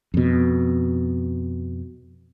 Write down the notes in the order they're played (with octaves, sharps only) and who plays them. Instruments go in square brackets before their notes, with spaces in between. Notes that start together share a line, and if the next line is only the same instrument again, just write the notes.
[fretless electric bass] F2 B2